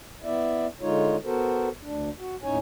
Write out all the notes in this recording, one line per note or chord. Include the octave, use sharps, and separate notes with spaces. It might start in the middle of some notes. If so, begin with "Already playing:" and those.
B3 E4 D5 E5
D3 G#3 D#4 F4 C#5
B3 F#4 A4 A#4 C5
D2 D4
F#4
D#2 A2 C#4 D#4 C#5 G#5